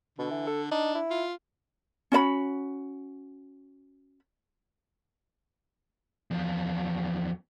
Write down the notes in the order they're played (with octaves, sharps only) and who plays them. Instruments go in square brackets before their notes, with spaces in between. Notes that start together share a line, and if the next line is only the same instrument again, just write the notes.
[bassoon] B2 [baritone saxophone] D3
[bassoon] E3
A4
[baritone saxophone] D4 [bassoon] D#4
[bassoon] E4
[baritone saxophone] F4
[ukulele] C#4 F#4 D5 B5
[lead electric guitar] E2 F3